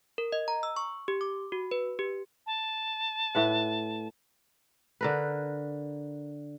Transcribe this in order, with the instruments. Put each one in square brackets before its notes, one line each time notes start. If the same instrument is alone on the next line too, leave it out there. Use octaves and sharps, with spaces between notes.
[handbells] A#4
D#5
A#5
E6
C#6
G4
D6
F#4
B4
G4
[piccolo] A5
[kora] A2 B4 F#5
D3 A#4 B4